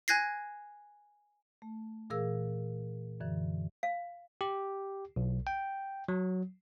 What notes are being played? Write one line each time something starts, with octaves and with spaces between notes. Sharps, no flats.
G#5 F#6 G#6 A#6 C7
A3
A#2 E3 G#4 A#4 F5 E6
F#2 D3 E3
F5
G4
B1
G5
F#3